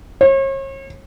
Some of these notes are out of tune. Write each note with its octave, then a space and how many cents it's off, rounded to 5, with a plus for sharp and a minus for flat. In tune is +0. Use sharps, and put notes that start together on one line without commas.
C#5 -40